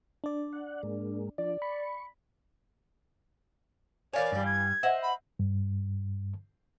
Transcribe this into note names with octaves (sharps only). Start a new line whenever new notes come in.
D4 D5
F#5
G#2 G#3 A#3
F3 D4 D5
B5 C#6
E3 A#4 C#5 D5 F5 G#5
G2 G3
G#6
C5 D#5 E5 F#5
B5
G2